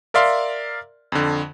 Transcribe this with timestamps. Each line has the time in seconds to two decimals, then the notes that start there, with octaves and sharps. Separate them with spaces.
0.14 A#4 D5 E5 F5 C6
1.12 F2 D3